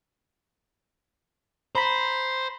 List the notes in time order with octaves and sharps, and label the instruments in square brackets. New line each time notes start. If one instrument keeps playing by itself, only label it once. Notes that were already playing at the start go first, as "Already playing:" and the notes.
[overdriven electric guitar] C5 [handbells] A#5 B5 B6